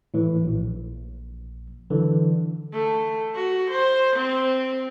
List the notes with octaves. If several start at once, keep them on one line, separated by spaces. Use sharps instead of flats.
A2 E3
A#1
D3 E3 F#3
A3
F#4
C5
C4